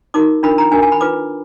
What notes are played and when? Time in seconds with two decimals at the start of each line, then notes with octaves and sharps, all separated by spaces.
0.14 D#4 F#4 A#4 D6
0.43 D4 F4 A#4 B5
0.58 A#5
0.72 D4 F#4 A#4 G#5
0.82 G#5
0.92 B5
1.01 F4 B4 D6